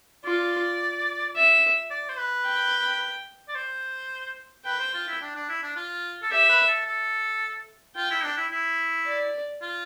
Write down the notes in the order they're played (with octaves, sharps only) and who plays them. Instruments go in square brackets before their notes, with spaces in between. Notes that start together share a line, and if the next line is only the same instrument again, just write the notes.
[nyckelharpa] F4 [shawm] D5
[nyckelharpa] E5
[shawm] D5
C5
B4
[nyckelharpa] G5
[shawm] D5
C5
[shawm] B4 [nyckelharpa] G5
[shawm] C5
F4
E4
D4
D4
E4
D4
F4
A4
[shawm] G4 [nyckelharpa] E5
[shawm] B4
A4
A4
[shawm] F4 [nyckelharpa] G5
[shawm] E4
D4
E4
E4
[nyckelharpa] D5
[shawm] F4